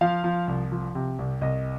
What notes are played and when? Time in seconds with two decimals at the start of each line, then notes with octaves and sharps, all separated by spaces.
0.01 F3 F5
0.24 F3
0.48 C2
0.72 F3
0.95 C3
1.19 C2
1.41 C2 D#5